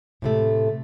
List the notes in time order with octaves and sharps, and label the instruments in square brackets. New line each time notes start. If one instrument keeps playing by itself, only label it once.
[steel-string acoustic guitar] A2 C3 A3